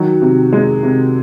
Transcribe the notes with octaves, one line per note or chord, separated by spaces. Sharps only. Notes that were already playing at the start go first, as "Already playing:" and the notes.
Already playing: D#3 F#3 F#4
C3
G#3
C3